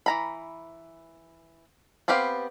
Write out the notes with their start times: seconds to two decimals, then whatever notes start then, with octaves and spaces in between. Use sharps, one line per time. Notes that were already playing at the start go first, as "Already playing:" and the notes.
0.06 E3 A#5 B5
2.08 B3 C4 G4 B4 F5